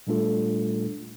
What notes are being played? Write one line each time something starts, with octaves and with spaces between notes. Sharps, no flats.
A#2 G3 A3 D4 F4 A4